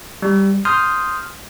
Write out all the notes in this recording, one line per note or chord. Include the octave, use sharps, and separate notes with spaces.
G3
C6 D#6 F6 G6